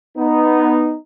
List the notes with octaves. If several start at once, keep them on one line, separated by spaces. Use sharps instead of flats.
B3 D#4